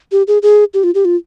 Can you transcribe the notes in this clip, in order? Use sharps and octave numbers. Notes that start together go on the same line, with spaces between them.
G4
G#4
G#4
G4
F4
G4
F4